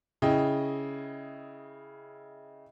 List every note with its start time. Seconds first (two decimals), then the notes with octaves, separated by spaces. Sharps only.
0.22 C#3 E4 D#5 G5